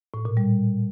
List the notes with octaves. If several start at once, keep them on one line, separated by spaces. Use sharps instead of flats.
A2
A#2
G3